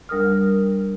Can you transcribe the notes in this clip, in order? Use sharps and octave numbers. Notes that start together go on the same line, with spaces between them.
D2 G3 A#4 D#6 F6